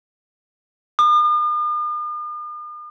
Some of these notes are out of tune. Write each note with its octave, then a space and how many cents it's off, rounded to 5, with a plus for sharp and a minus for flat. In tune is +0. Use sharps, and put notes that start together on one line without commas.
D#6 -45